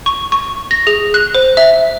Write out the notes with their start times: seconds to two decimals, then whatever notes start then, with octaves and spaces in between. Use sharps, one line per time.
0.06 C#6
0.32 C#6
0.71 A#6
0.87 G#4
1.14 F#6
1.35 C5
1.57 E5